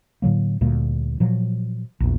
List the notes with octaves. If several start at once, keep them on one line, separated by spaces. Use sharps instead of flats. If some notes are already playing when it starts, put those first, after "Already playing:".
A2 D3 F#3 A#3
D2 A#2 G3 A#3
A#2 F3 F#3
A#1 E2